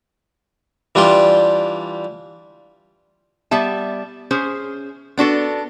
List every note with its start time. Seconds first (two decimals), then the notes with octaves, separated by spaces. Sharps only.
0.95 E3 G3 D4 F4 G4 C6
3.51 G3 B3 E5 A5
4.31 C#4 G#4 C5
5.18 B3 D4 F#4 A4